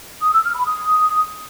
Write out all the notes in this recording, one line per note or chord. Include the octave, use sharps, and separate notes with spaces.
D#6
E6
F6
B5
D#6